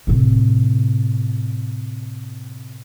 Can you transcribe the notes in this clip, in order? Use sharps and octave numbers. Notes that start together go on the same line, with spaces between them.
A2 C3